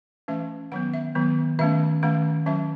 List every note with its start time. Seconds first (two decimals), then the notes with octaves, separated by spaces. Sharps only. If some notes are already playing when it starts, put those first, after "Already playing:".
0.28 E3 A3 C#4 E5
0.72 D#3 F#3 B3 F#5
0.94 E5
1.15 D#3 F#3 B3
1.59 D#3 A3 C#4 E5
2.03 D#3 A3 C#4 F#5
2.46 D#3 F#3 C#4 E5